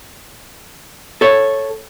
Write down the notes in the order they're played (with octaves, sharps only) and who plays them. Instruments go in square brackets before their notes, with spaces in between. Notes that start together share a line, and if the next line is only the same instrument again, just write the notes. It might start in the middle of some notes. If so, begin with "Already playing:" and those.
[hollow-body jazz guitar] A4 C#5